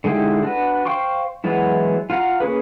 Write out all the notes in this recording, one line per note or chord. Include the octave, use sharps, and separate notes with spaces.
D3 G#3 D#4 E4 G4
D4 F#4 B4
C5 F5 G5 C6 C#6
E3 F#3 G#3 B3 E4
F4 F5 F#5 A#5
A#3 C#4 G#4 B4